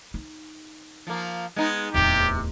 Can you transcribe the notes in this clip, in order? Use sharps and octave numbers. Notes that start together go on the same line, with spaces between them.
D#4
F3 A#3
G#3 B3 D#4
D1 E2 C3 G4